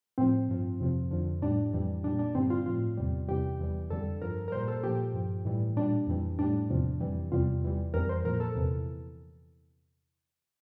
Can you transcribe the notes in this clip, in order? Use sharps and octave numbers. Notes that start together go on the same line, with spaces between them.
A2 F3 C4
G2 F3
F2 C3 F3
F2 D3 F3
A2 G3 D4
F2 E3 G3
A#2 G3 D4
D4
G2 D3 G3 C4
F4
A2 F3 F4
E2 C3 G3
E2 C3 E3 G3 G4
E2 E3 G3
F2 D3 G3 A4
G2 F3 A#4
A#4
A#2 G3 C5
A4
A#2 F3 G4
G2 F3
A2 E3 G3
A#2 G3 D4
F2 E3 G3
A2 G3 D4
E2 C3 F3
F2 E3 G3
E2 C3 G3 F4
E2 E3 G3
F2 E3 G3 A#4
C5
A#2 F3 A#4
A4
E2 C3 E3